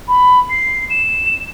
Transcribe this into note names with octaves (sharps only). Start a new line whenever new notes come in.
B5
C7
E7